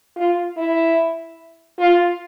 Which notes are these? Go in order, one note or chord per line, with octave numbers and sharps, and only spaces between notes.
F4
E4
F4